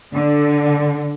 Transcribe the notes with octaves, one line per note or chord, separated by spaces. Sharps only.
D3